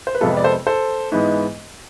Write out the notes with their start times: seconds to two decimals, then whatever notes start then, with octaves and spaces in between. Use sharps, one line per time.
0.07 C5
0.15 B4
0.20 F2 C3 G#3 B3 F4 A4
0.37 D5
0.44 A4 C5
0.67 A4 C5
1.12 G#2 E3 G#3 B3